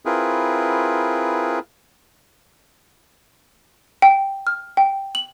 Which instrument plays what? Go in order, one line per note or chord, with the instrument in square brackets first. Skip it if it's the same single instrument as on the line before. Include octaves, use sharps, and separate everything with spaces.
[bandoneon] C4 E4 F4 G#4 A#4 B4
[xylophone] G5
F6
G5
F#7